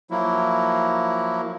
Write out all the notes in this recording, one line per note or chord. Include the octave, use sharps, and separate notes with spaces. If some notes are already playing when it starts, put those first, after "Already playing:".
F3 F#3 A#3 E4